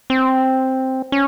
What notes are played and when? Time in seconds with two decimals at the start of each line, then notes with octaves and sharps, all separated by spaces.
0.10 C4
1.12 C#4